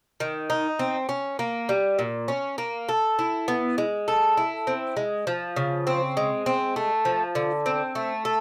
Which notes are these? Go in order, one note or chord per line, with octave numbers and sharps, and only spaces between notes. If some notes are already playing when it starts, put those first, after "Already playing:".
D#3
D#4
C4
C#4
A#3
G3
A#2
C#4
A#3
A4
E4
B3
G#3
A4
E4
C4
G#3
F3
C#3
C4
G#3
C4
A3
F3
D3
C4
A3
A4